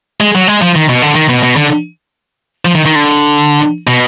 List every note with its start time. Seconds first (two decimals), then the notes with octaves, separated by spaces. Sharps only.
0.20 G#3
0.35 F#3
0.47 G#3
0.62 F3
0.76 D#3
0.89 B2
1.02 D3
1.15 D#3
1.29 B2
1.43 B2
1.56 D3
2.65 F3
2.75 D#3
2.85 D#3
2.95 D3
3.87 B2